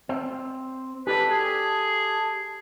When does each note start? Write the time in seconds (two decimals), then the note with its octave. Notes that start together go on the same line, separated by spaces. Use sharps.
0.09 C4
1.07 G4 A4 B4 D5
1.30 G#4